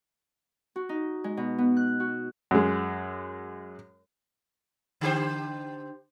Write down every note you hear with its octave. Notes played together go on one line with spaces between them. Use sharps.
F#4
D#4
G#3
B2
B3
F#6
F#4
F#2 G#3
D3 G4 C5